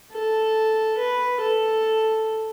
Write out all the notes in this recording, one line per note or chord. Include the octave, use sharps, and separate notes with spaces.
A4
B4
A4